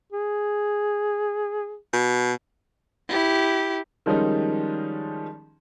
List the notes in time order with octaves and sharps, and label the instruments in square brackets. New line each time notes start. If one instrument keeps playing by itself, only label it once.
[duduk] G#4
[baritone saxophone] B2
[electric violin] E4 G4
[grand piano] D#3 F3 G3 G#3 C#4 D#4